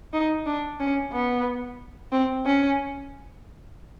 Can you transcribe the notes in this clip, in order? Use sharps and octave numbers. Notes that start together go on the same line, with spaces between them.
D#4
D4
C#4
B3
C4
C#4